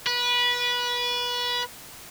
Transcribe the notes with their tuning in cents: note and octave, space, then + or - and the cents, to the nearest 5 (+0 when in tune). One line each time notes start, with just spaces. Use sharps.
B4 -20